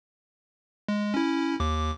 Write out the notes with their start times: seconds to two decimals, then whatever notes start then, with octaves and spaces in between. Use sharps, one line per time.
0.88 G#3
1.14 C#4 E4
1.60 D#2 D6